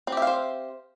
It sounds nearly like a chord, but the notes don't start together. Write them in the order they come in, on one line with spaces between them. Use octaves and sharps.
C4 G4 E5 F5 C5